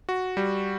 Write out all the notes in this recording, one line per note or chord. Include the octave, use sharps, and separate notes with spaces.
F#4
G3